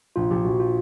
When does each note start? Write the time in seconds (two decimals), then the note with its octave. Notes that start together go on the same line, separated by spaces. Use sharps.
0.16 A#1 F4
0.31 A#1 G4
0.45 A#1 F#4
0.60 F4